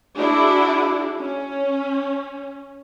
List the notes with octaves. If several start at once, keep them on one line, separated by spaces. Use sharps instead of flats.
D4 E4 F#4 G#4
C#4